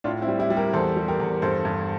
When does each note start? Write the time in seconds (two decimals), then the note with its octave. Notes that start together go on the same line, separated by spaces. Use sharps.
0.04 A2 D4 F4
0.22 C4 E4
0.28 G3
0.39 E4 G4
0.50 G3
0.56 G4 A#4
0.73 E2 A4 C5
0.96 G3
1.08 G4 A#4
1.20 E2
1.42 G2 A4 C5
1.65 G2